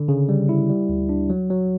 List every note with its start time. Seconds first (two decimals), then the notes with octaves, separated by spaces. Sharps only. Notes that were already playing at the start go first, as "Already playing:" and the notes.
Already playing: D3
0.08 C#3
0.29 G3
0.49 E4
0.69 G3
0.89 D2
1.09 D4
1.30 F#3
1.50 F#3